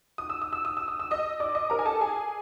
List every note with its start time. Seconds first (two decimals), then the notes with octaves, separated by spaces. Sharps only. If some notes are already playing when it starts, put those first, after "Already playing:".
0.18 D#6
0.30 E6
0.42 D#6
0.53 E6
0.65 D#6
0.77 E6
0.88 D#6
1.00 E6
1.11 D#5 D#6
1.40 D5 D6
1.55 D#5 D#6
1.70 A#4 A#5
1.79 G#5
1.86 A4 A5
2.01 G#4 G#5